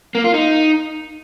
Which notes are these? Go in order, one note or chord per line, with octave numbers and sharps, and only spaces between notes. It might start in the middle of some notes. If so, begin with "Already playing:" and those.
A#3
F4
D#4